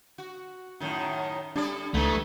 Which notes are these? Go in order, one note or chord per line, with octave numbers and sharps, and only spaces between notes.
F#4
F#2 A2 D#3
G3 D4 A4 D5
C#2 D#3 E3 A3 B3